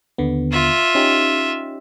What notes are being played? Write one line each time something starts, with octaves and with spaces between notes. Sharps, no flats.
D#2 D3 B3
F4 E5
C#4 D#4 G4